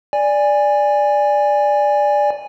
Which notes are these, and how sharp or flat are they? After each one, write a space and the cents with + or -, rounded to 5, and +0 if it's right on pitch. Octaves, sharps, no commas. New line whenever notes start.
D5 +0 G#5 -15